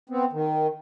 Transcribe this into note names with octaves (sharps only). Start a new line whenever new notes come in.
B3 C4
D#3